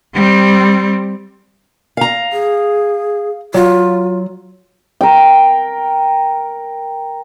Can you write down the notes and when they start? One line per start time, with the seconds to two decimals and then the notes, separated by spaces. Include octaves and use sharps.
0.14 G3 C4
1.97 F5 A#5
2.33 G#4
3.54 F#3 F4
5.01 A#4 G5